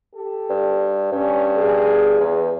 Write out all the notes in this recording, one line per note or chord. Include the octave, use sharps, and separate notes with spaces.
G4 A4
G2
G2 C#4
G#4
E2